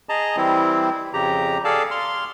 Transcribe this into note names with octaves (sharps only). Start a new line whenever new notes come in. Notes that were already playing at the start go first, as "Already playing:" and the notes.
G#4 D#5 A5 A#5
E3 G3 C4 E4
F2 C#3 G4 A#5
G#4 A4 D5 F5 A5
F5 C6 F6